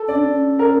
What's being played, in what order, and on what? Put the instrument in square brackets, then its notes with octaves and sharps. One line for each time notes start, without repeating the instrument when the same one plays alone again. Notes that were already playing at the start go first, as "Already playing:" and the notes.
Already playing: [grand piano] A4
[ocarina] C#4 [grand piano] D5
[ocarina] D4
C#4
[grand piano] A#4